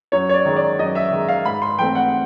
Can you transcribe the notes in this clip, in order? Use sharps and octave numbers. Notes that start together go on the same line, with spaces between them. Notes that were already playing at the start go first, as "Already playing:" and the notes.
F#2 C#5
C#5
D5
D#3 G#3
D5
F#2 D#5
E5
D#3 G#3
F5
G#2 B5
C6
E3 A3 C4 G5
F#5